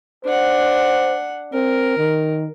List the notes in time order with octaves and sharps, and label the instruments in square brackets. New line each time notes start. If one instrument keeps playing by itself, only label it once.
[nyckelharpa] D4 F#5 [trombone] C5
[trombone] C4 [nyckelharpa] A#4
[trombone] D#3